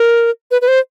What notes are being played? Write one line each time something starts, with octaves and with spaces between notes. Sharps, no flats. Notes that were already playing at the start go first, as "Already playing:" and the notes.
Already playing: A#4
B4
B4
C5